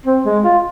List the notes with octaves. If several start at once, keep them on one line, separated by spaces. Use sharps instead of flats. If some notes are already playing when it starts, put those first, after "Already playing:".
C4
G#3
F4